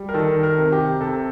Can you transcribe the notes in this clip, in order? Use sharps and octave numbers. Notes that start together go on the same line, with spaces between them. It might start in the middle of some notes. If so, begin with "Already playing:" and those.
Already playing: G3
A#4
D#3 A4
A#4
C3
G4
C3 A4